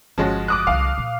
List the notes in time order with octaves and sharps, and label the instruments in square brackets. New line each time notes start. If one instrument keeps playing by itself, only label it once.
[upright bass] G1 [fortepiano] F3 G#3 F#4 [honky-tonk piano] C#4
[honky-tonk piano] D6 D#6 F#6
[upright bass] C2 D3 [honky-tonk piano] F5
[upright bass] A#2